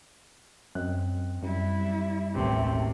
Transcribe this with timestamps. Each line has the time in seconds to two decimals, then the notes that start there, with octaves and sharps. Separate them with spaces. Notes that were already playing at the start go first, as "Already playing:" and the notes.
0.75 F#2 C4 D#5 F#6
1.43 F#2 G3 E4
2.35 E1 A1 D#2 A2 C3 A3